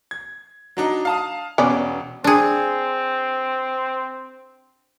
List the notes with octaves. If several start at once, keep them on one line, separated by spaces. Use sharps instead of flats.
G#6
F#3 D4 D#4
F5 A5 D#6
E1 B3 C#4 D5
C4 D4 G#4